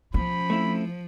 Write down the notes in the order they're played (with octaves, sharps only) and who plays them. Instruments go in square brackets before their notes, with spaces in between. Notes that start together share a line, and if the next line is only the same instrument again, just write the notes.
[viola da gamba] F3 [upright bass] C#4 [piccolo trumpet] B5
[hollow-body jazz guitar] A3 C4 E4